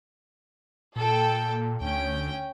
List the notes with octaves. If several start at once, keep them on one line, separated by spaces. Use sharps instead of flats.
A#2 A4 G5
D2 C#4 G5